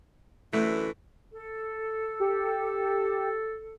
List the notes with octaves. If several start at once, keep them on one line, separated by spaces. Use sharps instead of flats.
F#2 D3 E3 A3
A4
G4